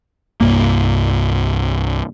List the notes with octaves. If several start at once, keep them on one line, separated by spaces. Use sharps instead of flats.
C2 G2 A#3